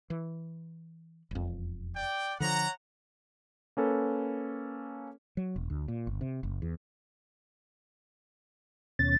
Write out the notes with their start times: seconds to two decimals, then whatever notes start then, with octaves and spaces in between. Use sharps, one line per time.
0.10 E3
1.31 E1 F2
1.95 D5 G5
2.40 D3 F3 C#5 F#5 A#5
3.77 A#3 C#4 A4 B4
5.37 F#3
5.56 E1
5.70 D2
5.88 A#2
6.07 G1
6.21 C3
6.43 F#1
6.62 E2
8.99 D#2 B2 C#4 A6